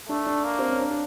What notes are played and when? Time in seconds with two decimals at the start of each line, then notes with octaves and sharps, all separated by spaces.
0.09 A3 D4
0.27 D4
0.44 A#3
0.59 C4
0.70 C#4
0.80 D4
0.91 D4